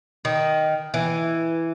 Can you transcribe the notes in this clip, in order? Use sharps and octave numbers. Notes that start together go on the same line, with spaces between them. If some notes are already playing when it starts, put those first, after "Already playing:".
D#3
E3